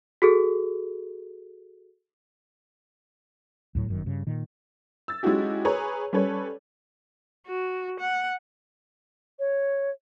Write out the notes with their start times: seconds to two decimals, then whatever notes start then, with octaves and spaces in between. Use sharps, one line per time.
0.22 F#4 G#4 A4
3.75 D2 A2 F#3
3.88 G1 F#2 D#3
4.06 G2 C#3
4.27 A#2 D#3
5.08 E6 A6
5.23 G#3 C#4 D#4 E4 F#4 G4
5.65 G#4 B4 C#5 A#5
6.13 G3 C#4 A4 B4 C#5
7.47 F#4
8.00 F#5
9.39 C#5